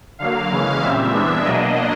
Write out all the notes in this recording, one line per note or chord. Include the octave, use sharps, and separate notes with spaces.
D3 F#3 A#3 F5
C#3 E3 G#3 C#4
A#2 G3 C4 E5
E3 G#3 B3 D4
B2 F#3 A#3 D4 D#5